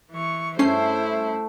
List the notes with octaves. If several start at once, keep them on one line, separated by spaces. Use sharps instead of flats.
E3 C#6
G2 A3 C#4 E4 C5 C7